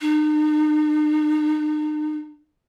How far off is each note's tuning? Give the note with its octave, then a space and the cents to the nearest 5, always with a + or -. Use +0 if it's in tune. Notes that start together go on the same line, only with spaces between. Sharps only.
D#4 -40